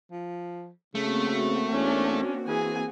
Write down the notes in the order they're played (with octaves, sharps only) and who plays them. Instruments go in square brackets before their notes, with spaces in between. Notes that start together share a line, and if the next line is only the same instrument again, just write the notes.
[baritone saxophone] F3
[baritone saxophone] C#3 [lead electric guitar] A3 [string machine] A#3 C4 F#4
[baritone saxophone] E2 [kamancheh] C#4 D4
[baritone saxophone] E3 [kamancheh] G#4 G#5